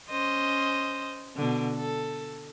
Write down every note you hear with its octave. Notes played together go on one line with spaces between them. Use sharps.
C#4 C5 D#5
B2 D3
A4